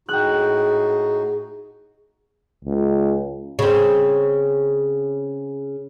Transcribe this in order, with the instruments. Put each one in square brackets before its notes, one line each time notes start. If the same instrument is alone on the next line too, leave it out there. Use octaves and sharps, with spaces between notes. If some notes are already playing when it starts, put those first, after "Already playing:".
[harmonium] A2 D#4 F#4 [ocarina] G#4 [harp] G5 F#6
[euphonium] C#2
[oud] C#3 C4